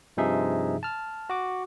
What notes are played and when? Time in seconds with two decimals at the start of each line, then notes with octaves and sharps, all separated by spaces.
0.17 G2 C3 F3 D#4 G#4 E5
0.83 A5 F6
1.30 F#4 D6